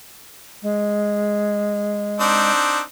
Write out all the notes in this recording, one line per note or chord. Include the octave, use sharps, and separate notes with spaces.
G#3
C4 D4 D#4